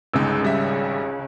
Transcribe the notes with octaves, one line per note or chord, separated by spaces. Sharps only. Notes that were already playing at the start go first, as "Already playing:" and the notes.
G1 C#2 G#3 D#4 E6
G#1 C#3 G3 E5